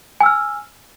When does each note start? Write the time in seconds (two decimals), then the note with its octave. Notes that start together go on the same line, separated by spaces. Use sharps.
0.20 G#5
0.23 E6
0.26 F6